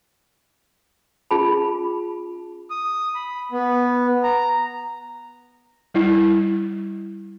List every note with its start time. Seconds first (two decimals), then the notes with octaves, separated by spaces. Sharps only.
1.31 C#4 F4 G#4 A5 B5
2.70 D#6
3.15 B5
3.52 B3
4.23 A#5
5.94 G3 E4